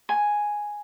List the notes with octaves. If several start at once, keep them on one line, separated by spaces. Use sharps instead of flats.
G#5